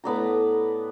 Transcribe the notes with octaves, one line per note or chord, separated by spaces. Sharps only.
A2 B3 D5 A#5